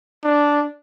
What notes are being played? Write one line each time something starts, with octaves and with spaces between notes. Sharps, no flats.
D4